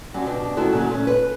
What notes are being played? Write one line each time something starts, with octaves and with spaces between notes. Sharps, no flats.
D2 F#3 G3 C#4
B2 D4 G4
D#3 A3 C#4 E4 F#4 A4
A#2 C#3 F#3
A3 C#4
B4